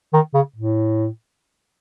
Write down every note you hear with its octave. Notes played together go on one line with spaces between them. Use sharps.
D#3
C#3
A2